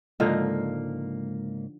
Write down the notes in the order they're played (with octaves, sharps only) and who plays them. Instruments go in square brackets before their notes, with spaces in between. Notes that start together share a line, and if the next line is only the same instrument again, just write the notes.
[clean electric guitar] C#2 G#2 A#3 [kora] D3 F3 D#4